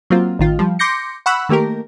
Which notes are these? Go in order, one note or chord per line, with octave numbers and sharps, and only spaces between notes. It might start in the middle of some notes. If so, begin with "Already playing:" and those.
F#3 A#3 C4 F4
A1 D#3 F4
F3 G3
C6 D6 G6 A#6 C#7
F#5 B5 C#6 E6 F#6
D#3 A3 A#3 G4 A#4